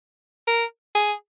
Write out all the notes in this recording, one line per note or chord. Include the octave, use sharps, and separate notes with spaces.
A#4
G#4